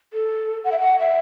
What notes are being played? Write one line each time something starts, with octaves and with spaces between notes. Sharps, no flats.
A4
F#5
E5
F#5
E5